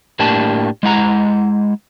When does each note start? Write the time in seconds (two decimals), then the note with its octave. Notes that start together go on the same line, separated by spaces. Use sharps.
0.19 A2 A#3 D4 G4 A5
0.83 G#3 E4 F#5 A#5